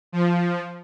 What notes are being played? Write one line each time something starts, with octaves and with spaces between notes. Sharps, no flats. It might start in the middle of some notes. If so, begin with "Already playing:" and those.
F3